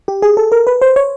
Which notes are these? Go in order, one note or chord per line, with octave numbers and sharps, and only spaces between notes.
G4
G#4
A4
A#4
B4
C5
C#5